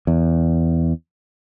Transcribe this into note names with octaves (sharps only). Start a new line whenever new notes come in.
E2